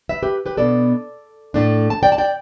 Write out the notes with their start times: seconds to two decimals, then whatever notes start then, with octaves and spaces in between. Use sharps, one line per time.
0.09 B4 E5
0.23 G4 B4
0.46 G4 B4
0.57 B2 B3 D4 A4 D5
1.54 A2 A3 D4
1.90 A5
2.03 D5 G5
2.12 A5
2.18 D5 G5